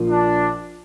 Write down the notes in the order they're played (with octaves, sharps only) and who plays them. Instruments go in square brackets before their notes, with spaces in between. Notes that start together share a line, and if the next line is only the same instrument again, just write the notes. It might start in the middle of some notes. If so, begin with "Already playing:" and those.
Already playing: [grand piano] A#1 A#2 F3 A#3 F4
[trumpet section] D4